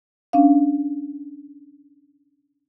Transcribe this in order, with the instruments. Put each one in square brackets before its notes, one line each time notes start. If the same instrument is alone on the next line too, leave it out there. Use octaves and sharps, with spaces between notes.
[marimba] C#4 D4 F5